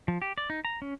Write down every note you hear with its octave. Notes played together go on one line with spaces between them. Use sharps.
F3
G4
D5
D#4
A#5
C#4